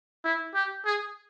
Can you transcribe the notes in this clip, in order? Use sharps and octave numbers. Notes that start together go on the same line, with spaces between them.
E4
G4
G#4